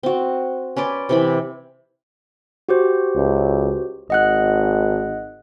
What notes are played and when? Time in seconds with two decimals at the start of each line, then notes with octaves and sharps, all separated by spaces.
0.03 C4 F#4
0.77 C#4 B4 D5 C6
1.09 C3 E3 B5
2.69 F#4 G4 C5
3.15 C#2
4.10 G#1 D#5 F#5 F#6